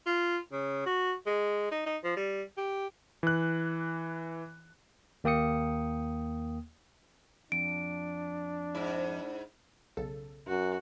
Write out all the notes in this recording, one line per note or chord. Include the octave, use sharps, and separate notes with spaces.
F4
C#3
F#4
G#3
D#4
D#4
F3
G3
G4
E3 F#6
D#2 A#3 G5 D#6 C#7
F2 D4 D7
G#2 E4
B1 C#3 A4
F#2 F#4